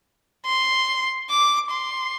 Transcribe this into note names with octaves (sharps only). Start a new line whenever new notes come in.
C6
D6
C6